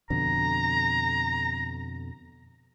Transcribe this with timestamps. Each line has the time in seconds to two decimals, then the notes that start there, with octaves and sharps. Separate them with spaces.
0.10 F2 B2 D3 A#5